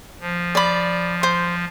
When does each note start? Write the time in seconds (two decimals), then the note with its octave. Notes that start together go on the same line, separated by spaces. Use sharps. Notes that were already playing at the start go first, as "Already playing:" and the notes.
0.21 F3
0.55 D5 B5
1.23 C5